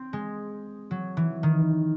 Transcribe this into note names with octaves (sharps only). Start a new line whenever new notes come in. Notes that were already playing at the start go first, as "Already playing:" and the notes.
Already playing: C4
G#3
F#3
E3
D#3